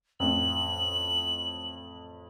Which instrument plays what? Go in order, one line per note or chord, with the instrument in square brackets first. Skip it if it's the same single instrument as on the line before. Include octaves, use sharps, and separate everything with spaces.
[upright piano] A1 F2 [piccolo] F#7